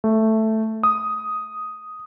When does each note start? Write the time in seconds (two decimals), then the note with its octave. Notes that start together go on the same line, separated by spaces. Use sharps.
0.04 A3
0.83 D#6